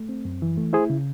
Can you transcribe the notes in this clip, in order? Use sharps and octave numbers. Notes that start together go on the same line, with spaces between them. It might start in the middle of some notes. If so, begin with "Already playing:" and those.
Already playing: A3
C4
F#2
E3
A3
E4 G#4 C5
C#3